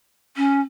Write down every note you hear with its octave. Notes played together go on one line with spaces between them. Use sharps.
C#4